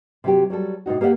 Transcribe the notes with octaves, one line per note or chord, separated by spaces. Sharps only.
C3 F#3 G4
F#3 G3 A4
A2 C3 D#4 F#4
A#3 G4 A4 E5 F#5